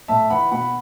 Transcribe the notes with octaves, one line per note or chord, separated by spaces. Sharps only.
A2 E5 A5
E3 F#5 B5
B2 F#5 B5